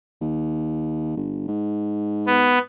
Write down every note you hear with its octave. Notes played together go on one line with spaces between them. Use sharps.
D#2
G1
G#2
B3